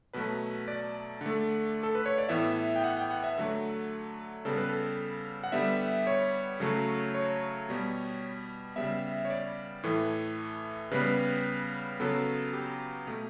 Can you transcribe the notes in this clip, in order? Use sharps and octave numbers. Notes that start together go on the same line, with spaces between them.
B2 F#3 A3 B4
D5
D3
A3
A4
B4
C#5
D5
A2 E3 B3 E5
G5
F#5
G5
F#5
E5
D3 F#3 A3
C#3 G3 B3 A4
B4
A4
F#5
D3 G3 B3 E5
C#5
C#3 F#3 A3
C#5
B2 G3 B3
C#3 G3 B3 E5
C#5
D5
A2 E3 A3
C#3 G3 B3 B4
C#3 F#3 B3 A4
G4
B2 A3